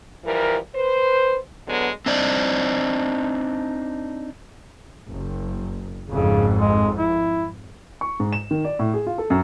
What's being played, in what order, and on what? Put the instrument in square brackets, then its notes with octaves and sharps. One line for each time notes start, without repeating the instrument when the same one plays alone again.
[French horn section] E3 F3 G3 A#4
B4 C5
D3 F#3 G#3 B3
[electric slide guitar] C4 D4 D#4 C5 D5
[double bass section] F#1
[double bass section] G#1 F2 G#2 [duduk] C#3
[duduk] G#3
E4
[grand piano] C#6
G#2
E7
D#3
D5
A2
G#4
F4
A4
F#2